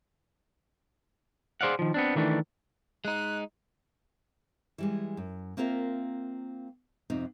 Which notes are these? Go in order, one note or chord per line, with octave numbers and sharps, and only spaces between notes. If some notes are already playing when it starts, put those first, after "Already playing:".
G#4 C5 D5 F5 F#5
D#3 F3
B3 C4 D4
D#3 E3 A3 D4
G#3 D#4 F#6
E3 G3 G#3
F#2
A#3 C4 F4 A#4 E5
F2 C3 C4 D#4